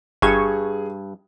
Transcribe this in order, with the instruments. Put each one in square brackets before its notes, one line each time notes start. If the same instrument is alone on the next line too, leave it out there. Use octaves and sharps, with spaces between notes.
[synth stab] G1 C#6 G#6 [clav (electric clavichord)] G2 [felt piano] G#4